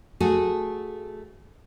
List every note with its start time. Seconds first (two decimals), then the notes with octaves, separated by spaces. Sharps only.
0.20 A3 F#4 G#4 A4